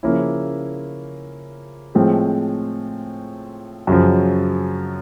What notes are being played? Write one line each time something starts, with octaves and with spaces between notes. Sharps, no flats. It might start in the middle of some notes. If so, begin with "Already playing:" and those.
C#3 F3 A#3 C#4 E4
A2 F3 G#3 C4
F#2 C#3 F3